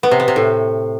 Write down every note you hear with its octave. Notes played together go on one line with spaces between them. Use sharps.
B3
C3
B3
C3
A2